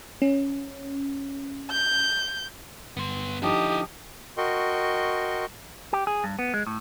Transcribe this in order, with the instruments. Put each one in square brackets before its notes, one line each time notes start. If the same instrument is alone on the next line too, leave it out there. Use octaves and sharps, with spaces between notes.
[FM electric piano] C#4
[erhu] G6
[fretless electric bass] G1 [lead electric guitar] B3 C6
[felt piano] D3 F3 D#4 [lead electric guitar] E4 D#5 [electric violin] G4 D#6
[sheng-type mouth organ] F#4 A#4 D#5 G5 C6 C#6
[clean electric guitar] G4
G#4
G2
B3
G#3
A2